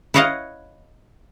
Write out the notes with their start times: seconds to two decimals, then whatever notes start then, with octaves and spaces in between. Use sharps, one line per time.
0.14 E4 B4 C#5 D#5 F5 F#5